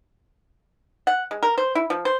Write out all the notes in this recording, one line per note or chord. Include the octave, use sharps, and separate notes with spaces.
F#5
G#3
A#4
C5
E4
F3
C5